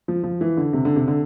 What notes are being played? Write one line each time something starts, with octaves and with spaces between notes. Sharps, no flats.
F3
F3
E3
D3
C3
D3
C3
D3